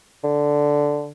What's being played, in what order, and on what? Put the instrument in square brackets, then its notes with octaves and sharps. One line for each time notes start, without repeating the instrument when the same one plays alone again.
[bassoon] D3